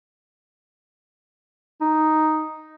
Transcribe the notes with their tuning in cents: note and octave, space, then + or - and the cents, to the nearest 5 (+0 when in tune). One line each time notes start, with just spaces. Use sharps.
D#4 +0